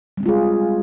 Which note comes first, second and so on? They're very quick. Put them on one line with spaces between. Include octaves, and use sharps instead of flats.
G3 C4 G#3 F4 G#4